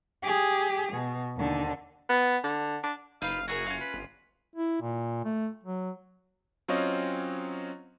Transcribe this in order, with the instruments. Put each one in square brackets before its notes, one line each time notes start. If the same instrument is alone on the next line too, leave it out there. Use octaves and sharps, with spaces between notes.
[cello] G4 G#4
B2
D#2 D3
[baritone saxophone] B3
D3
D4
[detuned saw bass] F#1 [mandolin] D#4 F4 B4 [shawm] F5
[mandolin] E4 G#4 A#4 [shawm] F#4
[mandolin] C#4 F4
[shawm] B4
[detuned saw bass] G1
[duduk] E4
A#2
A3
F#3
[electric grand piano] F#3 C4 C#4 F4 C#5 D#5